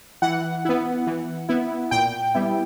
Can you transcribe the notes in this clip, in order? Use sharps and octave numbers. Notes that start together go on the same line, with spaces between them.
E3 F#5
B3 E4
E3
B3 E4
A#2 G5
G3 B3 E4